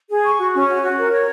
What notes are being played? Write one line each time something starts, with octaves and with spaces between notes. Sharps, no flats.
G#4
C#6
F#4
C#4
F#4
F#4
A#4
C#5